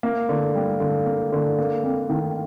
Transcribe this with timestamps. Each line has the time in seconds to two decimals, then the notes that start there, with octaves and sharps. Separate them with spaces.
0.03 A#3
0.29 D3
0.55 G3
0.80 D3
1.06 A#3
1.32 D3
1.59 A#3
1.83 F2
2.10 D#3